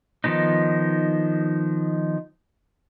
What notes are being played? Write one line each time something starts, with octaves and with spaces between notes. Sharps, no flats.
D#3 F3 B3 D#4